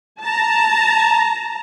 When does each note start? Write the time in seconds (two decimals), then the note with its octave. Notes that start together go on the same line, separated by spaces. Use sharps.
0.23 A5 A#5